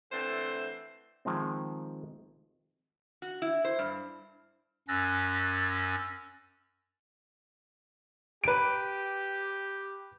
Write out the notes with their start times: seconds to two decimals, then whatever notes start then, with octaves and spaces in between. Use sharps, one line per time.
0.12 D3 E3 A3 C4 C5
1.25 D#3 F3 G#3 C4
3.22 F#4
3.42 E4
3.65 C5
3.79 G2
4.88 F#2 C#4 E6 F#6 A6 A#6
8.44 G4 B4 D7